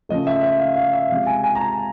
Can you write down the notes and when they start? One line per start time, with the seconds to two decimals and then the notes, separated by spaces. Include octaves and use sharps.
0.09 C#3 F3 A3 D#5
0.27 E5
0.43 E5
0.59 F5
0.76 F5
0.93 E5
1.09 C3 F3 G#3 F5
1.26 G#5
1.44 G#5
1.55 A#5
1.60 A5